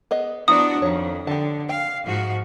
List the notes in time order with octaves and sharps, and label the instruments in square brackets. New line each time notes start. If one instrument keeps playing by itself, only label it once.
[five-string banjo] B3 G#4 D#5
[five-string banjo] F3 E4 A#5 [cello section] B3 D4 F#4 [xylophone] D#6
[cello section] F2 [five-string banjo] D#3 C#5
[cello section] D3 [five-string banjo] G4 A5
[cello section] F5 [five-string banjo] G5
[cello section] G#2 F3 F#4